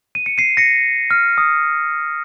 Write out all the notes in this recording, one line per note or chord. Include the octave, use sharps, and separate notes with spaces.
D#7
C#7
C7 D#7
A#6 C#7
F6
D#6